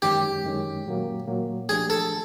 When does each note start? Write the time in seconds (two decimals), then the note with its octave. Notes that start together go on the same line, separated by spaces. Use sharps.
0.02 F#2 D#3 G#3 C#4 G4
0.44 F#2 D#3 G#3 C#4
0.86 A#2 F#3 A#3
1.28 A#2 F#3 A#3
1.69 F3 A3 D4 G4 G#4
1.90 A4